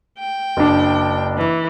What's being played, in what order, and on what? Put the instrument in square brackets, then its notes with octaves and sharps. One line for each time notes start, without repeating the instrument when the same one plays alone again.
[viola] G5
[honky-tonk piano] F#1 D4
[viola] E3